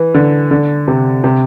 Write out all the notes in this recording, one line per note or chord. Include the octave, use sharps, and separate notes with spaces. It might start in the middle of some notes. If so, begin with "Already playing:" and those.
Already playing: E3
D3
D3
C3
C3